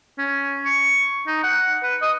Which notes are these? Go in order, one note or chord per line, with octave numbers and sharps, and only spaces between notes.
C#4
C#6
D#4
F#5
B4
D#5